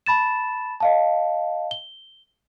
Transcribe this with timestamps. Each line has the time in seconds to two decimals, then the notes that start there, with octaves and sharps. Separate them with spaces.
0.06 A5 B5 A6 E7
0.80 D#5 F5 A5
1.71 G7